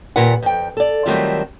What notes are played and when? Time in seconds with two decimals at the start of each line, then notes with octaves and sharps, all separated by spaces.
0.16 D#2 A#2 F4 A#4 B4 F#5
0.42 F2 G5
0.77 A4 D5
1.06 D#3 F#3 G3 A3 C4 F4